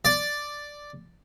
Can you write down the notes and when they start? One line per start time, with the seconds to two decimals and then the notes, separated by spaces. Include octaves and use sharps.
0.05 D5